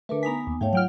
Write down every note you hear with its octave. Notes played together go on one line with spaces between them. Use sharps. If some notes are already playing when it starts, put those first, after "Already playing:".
D3 A3 D4 A#4 B4
B3 D#4 G#5 A#5 B6
D#2
G#2 A3 C#5 F5 G5
F#3 F4 F#5 G5 F6